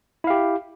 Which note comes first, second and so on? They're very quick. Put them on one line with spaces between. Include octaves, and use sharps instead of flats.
E4 F5 G4